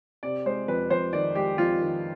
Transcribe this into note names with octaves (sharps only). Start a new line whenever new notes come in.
C3 D5
G#3 C5
F2 B4
F2 C5
D#3 D5
G#3 G4
F2 F4
D#3